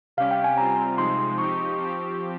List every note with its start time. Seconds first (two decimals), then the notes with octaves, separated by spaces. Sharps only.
0.17 C3 G3 C#4 G4 F5
0.31 G5
0.44 G#5
0.57 C3 G3 C4 F4 A#5
0.97 C3 F3 G#3 C4 D#4 C6
1.37 F3 C4 D#4 G4 C#6
1.78 F3 C4 G4